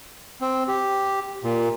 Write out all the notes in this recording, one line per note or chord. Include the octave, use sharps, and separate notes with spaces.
C4
G4
A#2